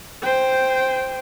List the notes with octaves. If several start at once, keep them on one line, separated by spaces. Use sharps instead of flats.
C5 G5